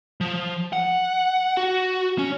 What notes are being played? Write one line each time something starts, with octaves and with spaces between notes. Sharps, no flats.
F3
F#5
F#4
C#4